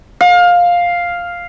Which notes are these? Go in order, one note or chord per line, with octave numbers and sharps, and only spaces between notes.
F5